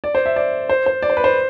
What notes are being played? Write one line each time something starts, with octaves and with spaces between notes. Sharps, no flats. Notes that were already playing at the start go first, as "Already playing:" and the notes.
D5
C5
E5
D5
C5
C5
D5
C5
B4
C5